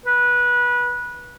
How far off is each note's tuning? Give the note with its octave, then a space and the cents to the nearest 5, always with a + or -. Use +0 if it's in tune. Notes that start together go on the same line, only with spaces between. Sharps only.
B4 -20